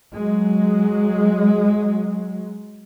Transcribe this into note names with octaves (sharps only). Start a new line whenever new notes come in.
F#3 G#3